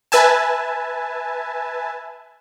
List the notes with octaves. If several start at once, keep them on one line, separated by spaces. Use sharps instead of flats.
B4 E5 G#5 A5